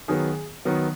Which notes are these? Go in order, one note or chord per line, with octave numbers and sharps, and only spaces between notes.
D#3 F#3 B3 G#4
D#3 F#3 B3